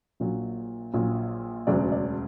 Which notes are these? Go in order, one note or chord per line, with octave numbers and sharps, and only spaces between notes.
A#1 A#2 F#3
A#1 A#2 F#3
E1 D2 C#3 F#3 D5
D5